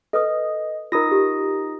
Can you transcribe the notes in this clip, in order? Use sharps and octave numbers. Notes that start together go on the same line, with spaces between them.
A4 B4 D#5 D#6
D#4 F4 A#4 D#6 A#6
G4